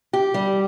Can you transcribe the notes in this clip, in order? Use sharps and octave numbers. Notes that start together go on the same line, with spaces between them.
G4
G3